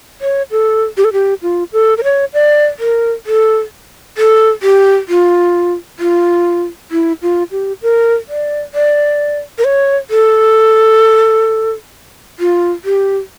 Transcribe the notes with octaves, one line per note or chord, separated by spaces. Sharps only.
C#5
A4
G4
A4
G4
F4
A4
A#4
C#5
D5
A#4
A4
A4
G4
F4
F4
E4
F4
G4
A#4
D5
D5
A#4
C#5
A4
F4
G4